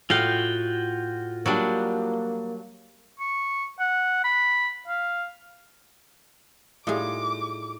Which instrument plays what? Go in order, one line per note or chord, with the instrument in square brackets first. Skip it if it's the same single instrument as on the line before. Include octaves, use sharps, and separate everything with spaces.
[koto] A2 F5 [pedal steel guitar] F4 F#4 G5
[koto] F#3 G3 D4 [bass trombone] A#3
[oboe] C#6
F#5
B5
F5
[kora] A2 G3 D#4 [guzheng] F4 G#4 [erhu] D6